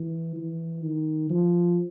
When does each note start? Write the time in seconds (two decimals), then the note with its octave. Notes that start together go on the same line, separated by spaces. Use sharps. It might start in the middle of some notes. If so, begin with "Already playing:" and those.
Already playing: E3
0.36 E3
0.83 D#3
1.30 F3